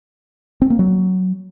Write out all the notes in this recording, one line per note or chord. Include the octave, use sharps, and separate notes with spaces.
C4
A#3
F#3